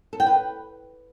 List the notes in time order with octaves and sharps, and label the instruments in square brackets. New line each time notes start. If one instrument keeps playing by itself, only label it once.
[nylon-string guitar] A4
G5
B4